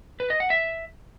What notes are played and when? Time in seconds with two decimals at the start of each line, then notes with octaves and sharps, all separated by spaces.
0.20 B4
0.30 D#5
0.40 F#5
0.50 E5